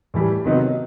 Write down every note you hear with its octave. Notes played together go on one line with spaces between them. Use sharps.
A2 E3 G3
C3 D#3 F#3 B3 D#4